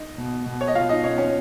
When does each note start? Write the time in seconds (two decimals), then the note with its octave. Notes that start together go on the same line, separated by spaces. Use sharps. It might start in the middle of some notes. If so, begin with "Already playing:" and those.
Already playing: D#4
0.18 B2
0.46 B2
0.61 C#5
0.68 D#5
0.75 B2 F4 F5
0.89 D#4 D#5
1.04 B2 C#4 C#5
1.18 C#4 C#5